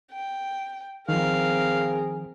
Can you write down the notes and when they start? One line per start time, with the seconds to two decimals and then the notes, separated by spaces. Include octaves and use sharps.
0.12 G5
1.09 D#3 F3 C4 G#4 A#4 F5